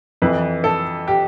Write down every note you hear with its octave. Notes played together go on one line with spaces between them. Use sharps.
F2 E3 B4
A4
G4